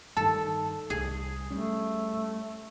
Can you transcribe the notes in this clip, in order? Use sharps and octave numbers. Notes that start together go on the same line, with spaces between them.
G2 D#3 A4 A5
C2 G#4
G3 A3 C#4